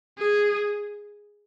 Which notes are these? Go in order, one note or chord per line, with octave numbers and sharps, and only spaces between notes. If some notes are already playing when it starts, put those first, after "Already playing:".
G#4